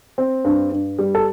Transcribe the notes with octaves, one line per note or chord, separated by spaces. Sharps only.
C4
G2
G2
G3
A4